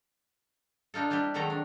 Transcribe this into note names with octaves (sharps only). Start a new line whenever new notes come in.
D4 D#4 F4 A4
G3 C4 D4 E4 G4
C3 D#3 F#3 G#3 A4 A#5
D4